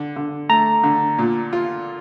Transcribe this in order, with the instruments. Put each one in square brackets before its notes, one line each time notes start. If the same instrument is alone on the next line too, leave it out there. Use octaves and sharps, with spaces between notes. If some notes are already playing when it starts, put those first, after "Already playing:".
Already playing: [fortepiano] D3
D3
[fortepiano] A3 [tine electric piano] A#5
[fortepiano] D3
A#2
F4